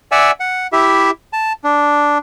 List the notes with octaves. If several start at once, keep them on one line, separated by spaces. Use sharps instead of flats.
D5 E5 F#5 G#5 E6
F#5
E4 G4 E5
A5
D4